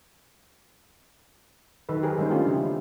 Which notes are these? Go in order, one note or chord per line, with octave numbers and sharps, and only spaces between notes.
D#3 F#3 A4 B4
G4 G#4 A#4 C5
D#3 G3 G#3 C#4 C5
A3 A#3 D4 F4 G4 A4
C#3 F3 G#3 E4 F4 G4
D#3